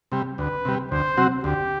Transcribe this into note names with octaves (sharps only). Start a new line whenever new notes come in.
C3 G3
D2 B4
C3 G3
D2 C5
C3 F#3 C4 F#4
D2 G4